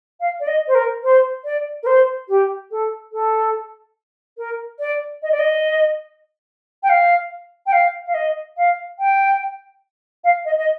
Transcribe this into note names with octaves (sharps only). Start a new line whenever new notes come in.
F5
D5
D#5
C5
A#4
C5
D5
A#4
C5
G4
A4
A4
A#4
D5
D#5
D5
D#5
G5
F5
G5
F5
F5
D#5
F5
G5
F5
D#5
D#5